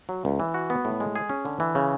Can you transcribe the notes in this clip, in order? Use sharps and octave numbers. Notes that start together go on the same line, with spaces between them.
F#3
C#2
E3
F#4
B3
A2
G#3
G#4
C#4
D3
E3
C#3